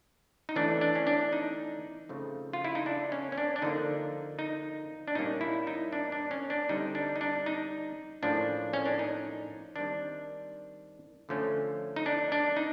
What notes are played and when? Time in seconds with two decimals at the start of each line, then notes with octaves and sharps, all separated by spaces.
0.49 D#4
0.56 E3 A3 C#4 D4
0.81 D4
0.95 C#4
1.07 D4
1.33 D#4
2.09 C#3 F3 A3 C4
2.53 F4
2.65 E4
2.75 D#4
2.86 D4
3.12 C#4
3.32 C#4
3.37 D4
3.56 D4
3.62 D3 F3 A#3 D#4
4.39 D#4
5.08 D4
5.15 A#2 G3 A#3 C#4 D#4
5.41 E4
5.67 D#4
5.92 D4
6.12 D4
6.31 C#4
6.50 D4
6.69 D3 G3 C4 D#4
6.95 D4
7.16 D#4
7.21 D4
7.46 D#4
8.22 A2 F3 A#3 C#4 D4
8.73 C#4
8.86 D4
8.99 D#4
9.76 D#3 G3 C4 D4
11.29 D3 F3 A3 C#4
11.96 D#4
12.06 D4
12.32 D4
12.57 D#4